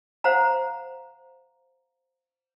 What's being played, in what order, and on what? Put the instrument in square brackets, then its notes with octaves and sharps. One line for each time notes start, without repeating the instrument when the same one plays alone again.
[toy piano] C5 F5 F#5 A#5